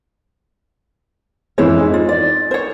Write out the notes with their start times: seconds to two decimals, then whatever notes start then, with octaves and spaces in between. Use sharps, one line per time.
1.58 F2 E3 G#3 E4 C5 C#5
1.79 D#4
1.94 F4
2.09 D5
2.51 C5 C#5